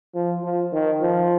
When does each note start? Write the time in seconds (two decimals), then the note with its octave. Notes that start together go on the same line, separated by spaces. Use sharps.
0.15 F3
0.44 F3
0.72 D#3
1.01 F3